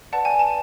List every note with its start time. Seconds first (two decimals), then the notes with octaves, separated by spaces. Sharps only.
0.13 B4 D5 F#5 A5
0.25 G#5
0.39 A5